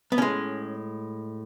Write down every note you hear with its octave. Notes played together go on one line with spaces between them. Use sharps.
B3
A2 G#3 C#4